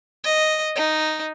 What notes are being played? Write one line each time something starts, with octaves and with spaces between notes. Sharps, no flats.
D#5
D#4